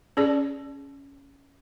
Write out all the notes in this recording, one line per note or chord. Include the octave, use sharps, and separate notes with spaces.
C#4 G#4 D5